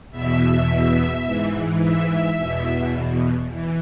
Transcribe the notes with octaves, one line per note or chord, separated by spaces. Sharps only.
E2 B2 E5
G#2 E3
E5
E5
E2 B2
E3